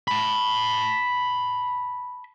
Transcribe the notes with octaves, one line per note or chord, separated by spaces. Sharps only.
A5 B5